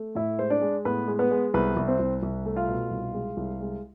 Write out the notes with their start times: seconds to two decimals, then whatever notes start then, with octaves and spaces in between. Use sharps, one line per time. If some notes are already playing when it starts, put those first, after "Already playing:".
Already playing: A3
0.15 A2 E4 E5
0.38 G#3 C5
0.50 D4 D5
0.61 G#3
0.85 A2 B3 B4
1.08 G#3
1.19 B3 B4
1.31 G#3
1.54 C2 B3 B4
1.76 C2
1.88 C4 C5
1.99 C2
2.23 C2
2.46 A3
2.56 F4 F5
2.68 B2
2.91 C2
3.14 G#3
3.37 C2
3.61 G#3